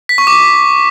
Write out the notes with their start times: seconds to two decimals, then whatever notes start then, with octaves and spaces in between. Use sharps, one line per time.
0.09 B6
0.18 C#6
0.27 D6